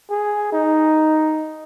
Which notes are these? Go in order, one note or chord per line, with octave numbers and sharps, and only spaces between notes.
G#4
D#4